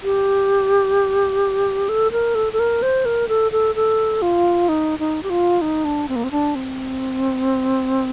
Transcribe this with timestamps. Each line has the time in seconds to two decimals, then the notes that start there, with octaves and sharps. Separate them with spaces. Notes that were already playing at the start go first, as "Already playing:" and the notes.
0.03 G4
1.89 A4
2.12 A#4
2.35 A4
2.53 A4
2.59 A#4
2.82 C5
3.05 A#4
3.29 A4
3.52 A4
3.75 A4
4.22 F4
4.69 D#4
4.99 D#4
5.23 G4
5.30 F4
5.61 D#4
5.85 D4
6.09 C4
6.16 A#3
6.24 C4
6.31 D4
6.55 C4